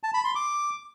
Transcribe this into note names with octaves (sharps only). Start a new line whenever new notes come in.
A5
B5
C6
D6